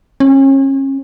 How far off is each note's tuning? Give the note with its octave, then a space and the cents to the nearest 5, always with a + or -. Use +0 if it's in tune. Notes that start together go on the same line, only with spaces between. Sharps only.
C#4 -35